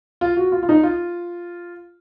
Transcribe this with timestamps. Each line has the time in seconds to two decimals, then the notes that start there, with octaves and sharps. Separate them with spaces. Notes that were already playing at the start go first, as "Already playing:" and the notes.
0.21 F4
0.37 F#4
0.52 F4
0.63 F4
0.69 D#4
0.83 F4